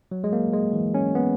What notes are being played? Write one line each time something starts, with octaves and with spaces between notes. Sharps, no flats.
F#3
G#3
A#3
G#3
E3
C#4
B3